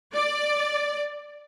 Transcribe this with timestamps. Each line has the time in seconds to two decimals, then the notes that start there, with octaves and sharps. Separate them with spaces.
0.15 D5